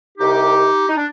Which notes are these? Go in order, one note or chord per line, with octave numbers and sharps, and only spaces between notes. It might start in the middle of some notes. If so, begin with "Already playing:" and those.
C2 C3 D#3 D#4 G4
D#4
D4